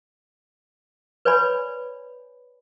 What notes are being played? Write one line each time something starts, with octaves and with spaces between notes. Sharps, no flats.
B4 C#5 D5 G#5 B5